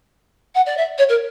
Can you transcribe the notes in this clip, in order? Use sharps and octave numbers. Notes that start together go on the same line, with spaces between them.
F#5
D5
E5
C#5
A#4